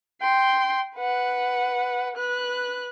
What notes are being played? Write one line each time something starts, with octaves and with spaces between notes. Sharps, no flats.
G5 C6
B4 F#5
B4 F#6